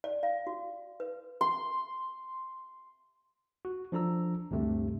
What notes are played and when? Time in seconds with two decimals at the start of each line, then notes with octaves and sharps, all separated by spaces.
0.04 D5
0.23 F5
0.47 F#4
1.00 B4
1.41 C6
3.65 F#4
3.92 F3 D4 A4 A#5 E6
4.51 D2 G2 C3 A3